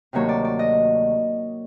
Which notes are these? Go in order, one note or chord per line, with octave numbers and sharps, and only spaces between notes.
D2 C3 D#3 F#3 A#3 C#5
D5
D5
D#5